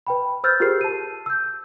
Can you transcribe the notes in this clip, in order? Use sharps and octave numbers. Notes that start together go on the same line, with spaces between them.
B4 G5 B5
C5 E6 F6 G6 A6
F4 G4 G#4 A#4 C5 C7
A5 D#7
E6 G6